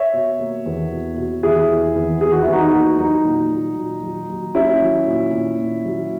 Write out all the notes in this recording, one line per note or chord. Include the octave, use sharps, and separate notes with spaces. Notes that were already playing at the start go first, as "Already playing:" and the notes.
Already playing: C#5 E5
B2
A#3
E2
B2
B2
E2 E4 G#4
E2
E2
E2 G#4
F#4
E4
E2
D#4 F#4
A#3
F#3 D#4
A#2
F#3
A#2
F#3
F#3
A#3 C#4 E4
F#3
A#2
A#2
A#2
F#3